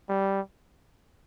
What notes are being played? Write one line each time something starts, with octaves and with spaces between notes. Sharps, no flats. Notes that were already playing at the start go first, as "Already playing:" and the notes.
G3